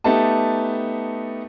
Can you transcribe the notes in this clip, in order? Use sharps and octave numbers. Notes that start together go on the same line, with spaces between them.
A3 B3 D#4 G4 A5